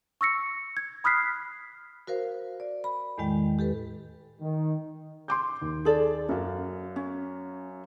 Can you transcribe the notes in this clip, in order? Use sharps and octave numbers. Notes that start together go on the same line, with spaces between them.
C#6 E6 A#6 C#7
G#6
B5 D#6 F6 F#6 B6 C7
F#4 A#4 C5 F5
D5
B5
E2 A2 D#3 G#3 G5
G4 A4 B4
D#3
C6 D6 G6
D#2
G#4 A4 D5
F#2 F#4 F5
C#4